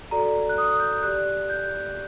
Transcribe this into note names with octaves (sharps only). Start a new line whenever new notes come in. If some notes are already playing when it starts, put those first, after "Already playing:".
F#4 A4 D5 A#5
F#6
D#6
G6
G4 D5 F#6
G6